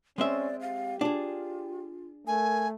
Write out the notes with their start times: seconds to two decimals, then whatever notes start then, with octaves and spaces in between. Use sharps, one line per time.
0.18 G#3 C4 C#4 D5 E5
0.61 G4 F5
1.01 D4 F4 G#4
2.27 A3 A#4 G#5